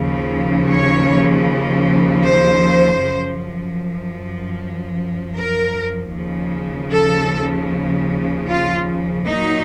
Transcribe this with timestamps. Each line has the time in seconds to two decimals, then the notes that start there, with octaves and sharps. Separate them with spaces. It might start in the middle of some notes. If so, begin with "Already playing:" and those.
Already playing: D#2 C#3 F3
0.67 C#5
2.23 C5
3.01 F#2 F3
5.36 A#4
6.13 D#2 C#3 F3
6.92 A4
8.48 F4
9.26 A#2 F#3 D#4